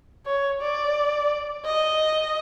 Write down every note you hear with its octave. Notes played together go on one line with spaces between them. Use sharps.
C#5
D5
D#5